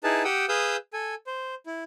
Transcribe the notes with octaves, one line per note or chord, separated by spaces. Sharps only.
D#4 E4 G#4 B4 A5
G4 F#5 G5 D#6 E6
G#4 B4 F5 D#6 E6 G6
A4 G#5
C5
E4